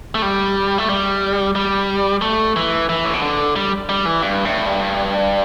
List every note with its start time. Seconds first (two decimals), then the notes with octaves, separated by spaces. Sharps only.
0.15 A3
0.22 G3
0.78 A3
0.89 G3
1.55 G3
2.22 A3
2.56 E3
2.89 E3
3.05 A2
3.14 B2
3.22 D3
3.56 G3
3.89 G3
4.05 E3
4.22 G2
4.45 A2
4.66 G2